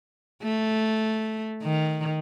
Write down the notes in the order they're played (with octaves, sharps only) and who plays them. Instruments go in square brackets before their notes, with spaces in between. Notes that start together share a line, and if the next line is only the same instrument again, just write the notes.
[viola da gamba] A3
D#3